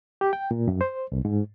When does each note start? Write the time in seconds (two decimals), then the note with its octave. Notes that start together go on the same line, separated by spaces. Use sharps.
0.21 G4
0.33 G5
0.51 A#2
0.68 F#2
0.81 C5
1.12 C2
1.25 G#2